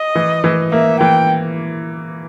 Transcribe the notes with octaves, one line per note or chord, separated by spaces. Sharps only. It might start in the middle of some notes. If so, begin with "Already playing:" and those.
Already playing: D#5
E3
E3
A#3 E5
E3 G5